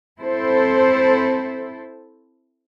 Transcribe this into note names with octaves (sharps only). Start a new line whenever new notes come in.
C4 E4 A4 C5